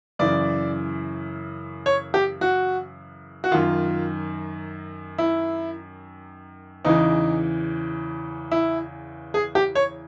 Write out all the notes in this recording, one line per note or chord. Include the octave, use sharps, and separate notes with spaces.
F#2 C#3 E3 D5
C#5
G4
F#4
F#4
F#2 D#3 F4
E4
E2 C#3 E3 D#4
E4
G#4
G4
C#5